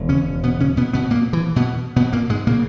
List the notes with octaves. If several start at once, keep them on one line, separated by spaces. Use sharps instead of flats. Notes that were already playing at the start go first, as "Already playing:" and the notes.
Already playing: E1 D#2
C#3 C#4
B2 B3
C#3 C#4
B2 B3
B2 B3
A#2 A#3
E3
B2 B3
B2 B3
A#2 A#3
G#2 G#3
A#2 C#3 A#3